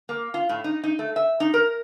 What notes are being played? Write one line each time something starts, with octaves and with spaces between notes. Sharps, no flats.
A#3
F4
A2
D#4
D#4
A3
E5
D#4
A#4